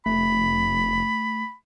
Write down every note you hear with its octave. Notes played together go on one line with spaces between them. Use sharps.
F1 A3 B5